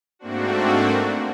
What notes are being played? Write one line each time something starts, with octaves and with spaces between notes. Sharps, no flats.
G#2 A3 A#3 C4 D4 F#4